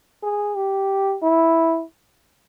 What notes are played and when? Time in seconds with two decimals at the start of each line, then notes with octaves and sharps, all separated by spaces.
0.23 G#4
0.56 G4
1.22 E4